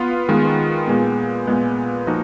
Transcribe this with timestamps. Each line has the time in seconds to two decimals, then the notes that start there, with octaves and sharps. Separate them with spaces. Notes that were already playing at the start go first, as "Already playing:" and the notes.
Already playing: B3 F4
0.29 D#3 G#3 B3 F4
0.87 A#2 G#3 B3
1.47 A#2 G#3 B3
2.07 F3 A#3 D#4 F#4